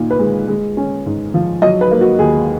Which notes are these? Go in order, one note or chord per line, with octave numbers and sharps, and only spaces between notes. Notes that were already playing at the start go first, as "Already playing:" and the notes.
Already playing: A#2 D#4
B4
G#3
G#3
C#4
G#2
F3
F#3 D#5
B4
A#3
F#4
D#2 G#4